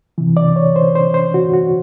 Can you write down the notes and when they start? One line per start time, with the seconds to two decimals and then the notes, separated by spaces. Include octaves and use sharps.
0.18 C3 E3
0.37 D5
0.56 C#5
0.76 C5
0.95 C5
1.14 C5
1.34 F#4
1.53 F#4